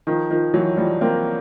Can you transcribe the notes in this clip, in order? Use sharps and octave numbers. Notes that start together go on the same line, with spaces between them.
D#3 F3
D#3 F3
E3 F#3
F3 G3
A#3 C4